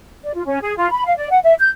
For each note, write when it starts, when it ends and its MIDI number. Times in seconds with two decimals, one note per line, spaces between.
0.22 0.33 74
0.34 0.45 65
0.46 0.58 61
0.61 0.74 68
0.77 0.88 65
0.90 1.04 83
1.05 1.16 77
1.16 1.29 74
1.30 1.38 78
1.43 1.54 76
1.59 1.69 91